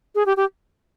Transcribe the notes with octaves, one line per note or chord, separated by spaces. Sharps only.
G#4
G4
G4